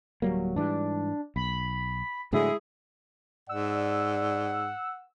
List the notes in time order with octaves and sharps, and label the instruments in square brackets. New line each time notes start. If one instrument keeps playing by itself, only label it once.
[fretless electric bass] D1 G3 A#3 [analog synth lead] F#3
[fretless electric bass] G#2 E3 G3 [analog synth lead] D4
[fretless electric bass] B1 [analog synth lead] B5
[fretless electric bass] A2 D3 F#3 [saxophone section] G#3 E4 G#4
[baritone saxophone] G#2 [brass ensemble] D5 [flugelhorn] F#5 [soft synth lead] E6